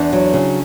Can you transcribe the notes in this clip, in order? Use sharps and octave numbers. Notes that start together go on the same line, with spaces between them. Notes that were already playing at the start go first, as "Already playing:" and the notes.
Already playing: E2 D4
F#3
C#3